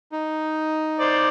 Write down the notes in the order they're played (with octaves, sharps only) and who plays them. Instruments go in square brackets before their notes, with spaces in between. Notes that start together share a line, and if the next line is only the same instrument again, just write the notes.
[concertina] D#4
[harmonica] C5 D5